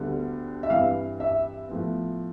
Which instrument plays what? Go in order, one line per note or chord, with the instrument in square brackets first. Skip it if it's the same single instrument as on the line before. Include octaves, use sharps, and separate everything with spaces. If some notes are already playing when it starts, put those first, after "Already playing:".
Already playing: [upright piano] D2 D3 G3 B3 D4
E5
G2 E3 G3 C4 F5
E5
A2 F3 B3